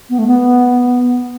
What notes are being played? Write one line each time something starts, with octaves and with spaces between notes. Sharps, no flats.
B3
A3
B3